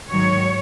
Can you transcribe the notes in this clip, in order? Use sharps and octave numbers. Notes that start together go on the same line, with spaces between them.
G#2 D#3 F#3 C#5